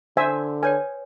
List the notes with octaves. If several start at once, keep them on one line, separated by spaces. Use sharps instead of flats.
D3 C5 E5 G#5
B4 C#5 G5 G#5